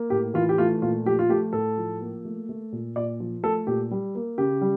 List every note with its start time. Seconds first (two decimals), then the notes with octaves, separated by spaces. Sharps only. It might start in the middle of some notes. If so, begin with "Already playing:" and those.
Already playing: A#3
0.10 A2 G4
0.34 E3 F4
0.49 G4
0.58 A3 F4
0.82 A#2 F4
1.06 F3 G4
1.19 F4
1.29 A3 G4
1.53 A2 A4
1.77 F3
2.01 A#3
2.25 A3
2.49 A3
2.72 A#2
2.96 A#2 D5
3.20 F3
3.43 A3 A4
3.67 A#2 G4
3.91 G3
4.15 A#3
4.38 C#3 G4
4.61 G3